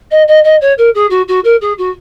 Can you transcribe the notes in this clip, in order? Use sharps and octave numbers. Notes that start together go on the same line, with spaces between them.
D#5
D#5
D#5
C#5
A#4
G#4
F#4
F#4
A#4
G#4
F#4